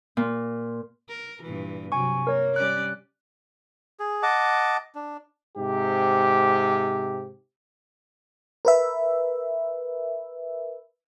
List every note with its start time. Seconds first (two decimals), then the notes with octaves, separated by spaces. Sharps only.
0.17 A#2
1.09 A#4
1.43 G2 A#2 E3
1.92 C3 F#3 G#5 C#6
2.27 A#3 A#4 C#5
2.56 G3 C#4 D5 F#6
4.00 G#4
4.23 D#5 F#5 A5 D6
4.95 D4
5.56 G#2 C3 G4
8.65 A#4 B4 E5